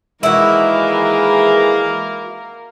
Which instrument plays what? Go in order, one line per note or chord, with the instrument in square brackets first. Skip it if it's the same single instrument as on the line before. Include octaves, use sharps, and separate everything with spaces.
[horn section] D#3 E3 G#3 [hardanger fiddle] A#3 A#4 [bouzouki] E4 F#4